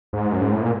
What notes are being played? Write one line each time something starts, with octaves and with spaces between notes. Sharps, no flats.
G#2
F#2
G#2
A2
A#2